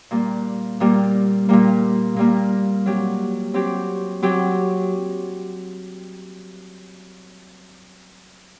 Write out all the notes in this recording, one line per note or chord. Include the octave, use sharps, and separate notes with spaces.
A#2 G3 A#3
A#2 G3 A#3
A#2 G3 A#3
A#2 G3 A#3
F#3 C4 G4
F#3 C4 G4
F#3 C4 G4